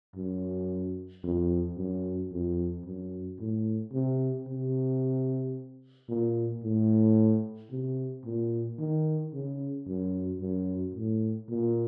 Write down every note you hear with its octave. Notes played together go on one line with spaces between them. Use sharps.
F#2
F2
F#2
F2
F#2
A2
C3
C3
A#2
A2
C3
A#2
D#3
C#3
F#2
F#2
A2
A#2